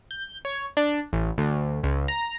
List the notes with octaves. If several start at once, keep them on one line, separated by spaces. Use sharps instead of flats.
G6
C#5
D4
A1
D2
C#2
A#5